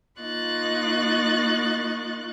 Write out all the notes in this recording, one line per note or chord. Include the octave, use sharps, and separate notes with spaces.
A#3 D#4 F4 C#6 F#6 A6